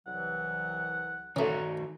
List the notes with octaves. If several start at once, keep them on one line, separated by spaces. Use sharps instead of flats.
C2 E3 F#3 F#5
D#3 A3 C#4 F#4 A#5